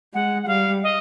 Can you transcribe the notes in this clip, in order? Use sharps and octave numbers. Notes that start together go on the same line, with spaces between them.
G#3 F#5
F#5
G3 F5
D#5